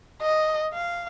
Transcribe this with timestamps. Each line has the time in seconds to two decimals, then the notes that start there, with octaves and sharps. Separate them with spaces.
0.21 D#5
0.73 F5